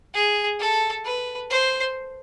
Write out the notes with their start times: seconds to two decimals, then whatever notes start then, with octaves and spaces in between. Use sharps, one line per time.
0.14 G#4
0.60 A4
1.05 B4
1.50 C5